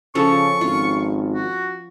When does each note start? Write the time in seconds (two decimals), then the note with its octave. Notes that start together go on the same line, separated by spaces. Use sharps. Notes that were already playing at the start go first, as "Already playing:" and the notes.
0.15 C#3 F3 C#4 A4 C#6
0.61 G#1 F4
1.34 F#4